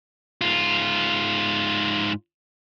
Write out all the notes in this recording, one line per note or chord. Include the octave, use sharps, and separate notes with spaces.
G#2 F4